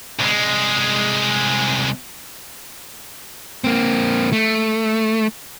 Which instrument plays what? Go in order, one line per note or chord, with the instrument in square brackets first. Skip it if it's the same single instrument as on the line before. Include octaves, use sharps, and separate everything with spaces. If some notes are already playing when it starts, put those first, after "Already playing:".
[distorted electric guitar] C2 G#3
[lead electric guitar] A#3 C4
A3